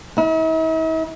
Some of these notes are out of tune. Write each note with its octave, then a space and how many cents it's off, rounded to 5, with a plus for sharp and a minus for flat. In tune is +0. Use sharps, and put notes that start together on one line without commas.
E4 -45